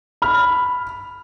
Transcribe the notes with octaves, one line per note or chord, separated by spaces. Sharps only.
B5 F6